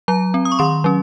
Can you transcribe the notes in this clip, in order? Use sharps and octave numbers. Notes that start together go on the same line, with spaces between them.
F#3 A#5
C4
D#6
C#6
D#3 C6
F#3 C#4